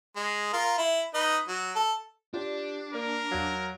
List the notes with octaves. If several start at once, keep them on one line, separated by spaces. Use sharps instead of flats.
G#3
F4 A#4
E4
D#4 B4 D#5
F#3
A4
D4 F4 G4 D5
A#3 A#4 D5
E2 F#3 F5